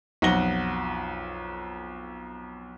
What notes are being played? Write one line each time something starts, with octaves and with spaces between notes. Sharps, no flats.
B1 F2 F#5 A#6 G7